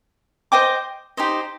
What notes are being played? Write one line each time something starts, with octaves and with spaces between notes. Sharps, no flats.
C5 D#5 G5 D6
D#4 G4 C5 D#5